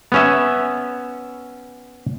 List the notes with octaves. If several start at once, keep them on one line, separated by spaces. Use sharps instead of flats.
B3 C#4 E5